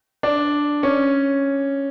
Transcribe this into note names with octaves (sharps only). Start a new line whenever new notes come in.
D4
C#4